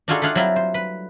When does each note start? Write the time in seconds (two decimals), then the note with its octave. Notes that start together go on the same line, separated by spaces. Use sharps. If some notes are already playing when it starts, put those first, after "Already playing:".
0.08 D4 D#4 F4 F#4 G#4 A4
0.22 A3 D4 F4 G#4 F5 F#5
0.35 F#3 G3 C4 E4 F4
0.56 C5
0.74 B4